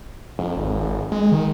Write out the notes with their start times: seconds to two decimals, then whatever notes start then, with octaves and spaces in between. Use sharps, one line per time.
0.39 F2
0.57 G#1
1.12 G#3
1.32 D#3